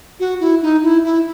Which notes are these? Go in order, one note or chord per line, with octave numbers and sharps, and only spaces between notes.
F#4
E4
D#4
E4
E4